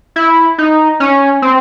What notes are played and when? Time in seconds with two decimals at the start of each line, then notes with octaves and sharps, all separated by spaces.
0.16 E4
0.58 D#4
1.00 C#4
1.42 C4